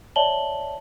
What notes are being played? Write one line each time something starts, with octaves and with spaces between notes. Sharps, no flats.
C#5 D5 E5 A5 F#7 G7